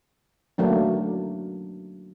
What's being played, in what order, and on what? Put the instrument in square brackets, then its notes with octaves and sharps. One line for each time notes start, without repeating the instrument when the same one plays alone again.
[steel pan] F#3 A3 A#3 D4